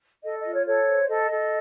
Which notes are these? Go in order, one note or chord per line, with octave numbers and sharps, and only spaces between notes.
A4 D#5
D#5
F4
C#5
A4 C#5
C5
A4 D#5
A4